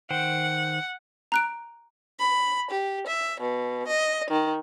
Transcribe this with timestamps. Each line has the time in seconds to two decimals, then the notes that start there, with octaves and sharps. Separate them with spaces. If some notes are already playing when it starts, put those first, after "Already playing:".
0.10 D#3 C5 F#5 G5
1.32 A#5 F#6 D7
2.20 B5
2.71 G4
3.07 E5
3.41 B2
3.87 D#5
4.31 D#3